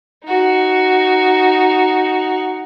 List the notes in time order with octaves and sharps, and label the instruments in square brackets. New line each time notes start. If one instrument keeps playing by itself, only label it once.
[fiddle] D#4 F#4